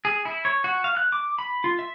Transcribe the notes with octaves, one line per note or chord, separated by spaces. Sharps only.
G#4
E4
C#5
F#4
F5
F#6
D6
B5
F4
E5